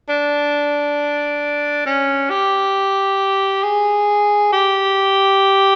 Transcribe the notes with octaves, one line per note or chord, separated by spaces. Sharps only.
D4
C#4
G4
G#4
G4